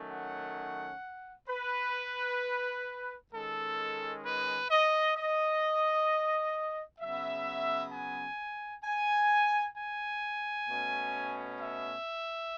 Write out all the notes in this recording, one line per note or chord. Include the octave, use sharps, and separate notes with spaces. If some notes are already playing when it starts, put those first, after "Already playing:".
Already playing: D#3 F#3 A3 C#4
F#5
B4
D#3 G#3 C#4 A4
B4
D#5
D#5
C#3 F#3 B3 E5
G#5
G#5
G#5
B2 A3 C#4
E5